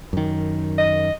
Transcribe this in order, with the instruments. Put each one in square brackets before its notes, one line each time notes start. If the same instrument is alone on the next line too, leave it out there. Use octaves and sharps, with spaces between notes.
[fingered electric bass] F#2 D#3
[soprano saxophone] D#5